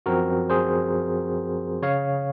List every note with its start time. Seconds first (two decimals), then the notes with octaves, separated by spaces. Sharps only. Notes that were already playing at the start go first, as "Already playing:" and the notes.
0.06 F#2 F3 C4 F#4 A#4
0.50 G#4 C5
1.82 C#3 C#5 F5